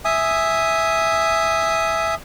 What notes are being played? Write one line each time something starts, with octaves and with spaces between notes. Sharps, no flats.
E5 G#5 D#6